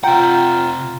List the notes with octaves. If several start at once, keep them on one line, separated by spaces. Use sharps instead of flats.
C3 F4 F#5 G5 A#5